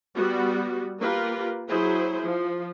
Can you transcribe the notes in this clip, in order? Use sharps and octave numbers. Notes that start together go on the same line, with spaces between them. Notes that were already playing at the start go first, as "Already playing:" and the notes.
G3 B3 F#4
A#3 F4 G4 A#4 B4
F#3 E4 G#4 C5
F3